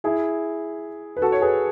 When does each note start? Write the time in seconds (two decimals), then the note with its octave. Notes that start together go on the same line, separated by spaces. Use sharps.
0.04 E4 G#4
1.17 B4
1.22 F#4 A4
1.32 C#5
1.41 G#4 B4